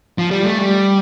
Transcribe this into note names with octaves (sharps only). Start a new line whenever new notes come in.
F3
G3
A3
G3